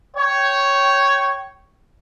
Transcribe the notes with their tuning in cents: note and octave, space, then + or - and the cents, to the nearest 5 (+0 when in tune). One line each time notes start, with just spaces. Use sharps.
C#5 +0 G5 -15